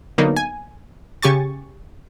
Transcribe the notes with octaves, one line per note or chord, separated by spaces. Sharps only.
D3 F#3 A#3 B3 D#4
G#5
C#3 G4 G#5 C#6 A6